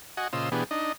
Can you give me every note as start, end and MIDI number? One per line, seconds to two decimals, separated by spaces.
0.17 0.28 66
0.17 0.28 75
0.17 0.28 78
0.17 0.28 80
0.33 0.49 46
0.33 0.49 49
0.33 0.49 65
0.33 0.49 72
0.33 0.49 75
0.33 0.49 88
0.52 0.64 47
0.52 0.64 52
0.52 0.64 59
0.52 0.64 62
0.52 0.64 67
0.52 0.64 68
0.71 0.92 62
0.71 0.92 63
0.71 0.92 75